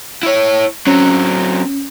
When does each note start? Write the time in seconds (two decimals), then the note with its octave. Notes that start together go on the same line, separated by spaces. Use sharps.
0.23 E4 C#5
0.87 F#3 C4 C#4